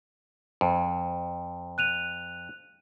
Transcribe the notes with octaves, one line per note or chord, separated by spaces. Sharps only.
F2
F#6 D#7 F7